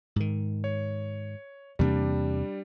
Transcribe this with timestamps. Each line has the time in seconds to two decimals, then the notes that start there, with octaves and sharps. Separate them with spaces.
0.16 G#2 D#3
0.64 C#5
1.79 E2 C3 G3 A#3 D4